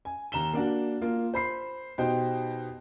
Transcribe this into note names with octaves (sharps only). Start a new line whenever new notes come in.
G#5
D#2 A#5 E7 G7
A#3 D4 F#4
A#3 F4
C5 B5 C7
B2 D#4 G4 C5 G5